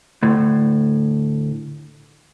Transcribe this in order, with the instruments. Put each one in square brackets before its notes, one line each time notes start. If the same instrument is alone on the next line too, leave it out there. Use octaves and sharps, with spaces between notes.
[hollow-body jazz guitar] D2 A2